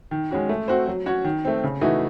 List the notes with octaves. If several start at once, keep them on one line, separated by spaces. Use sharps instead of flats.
D#3
G#3 C#4 F#4
A3
C4 F#4 C5
F#3
C#4 F#4 C#5
D#3
A3 C4
C#3
E3 A3 D#4 F#4